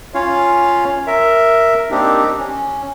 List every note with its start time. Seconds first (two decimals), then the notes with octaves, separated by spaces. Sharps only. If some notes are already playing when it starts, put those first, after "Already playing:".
0.14 C#4 F4 C#5 F5
1.07 A#4 E5
1.91 A#3 C4 D4 D#4 G4
2.39 C#4